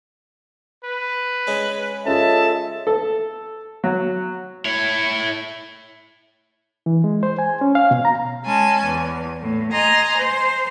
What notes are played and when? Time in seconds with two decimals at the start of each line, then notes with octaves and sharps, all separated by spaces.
0.84 B4
1.47 C#3 G#3
2.05 C#4 F4 G#4 A4 D#5 E5 A5
2.87 A4
3.84 F#3
4.65 E4 C#5
6.86 E3
7.04 G#3
7.23 C5
7.39 G#5
7.61 C#4
7.75 F5
7.91 B2
8.05 A#5
8.44 G#3 C#4 G#5 A5
8.83 E2
9.42 A2
9.71 D#5 G#5 A#5 C6
10.17 C5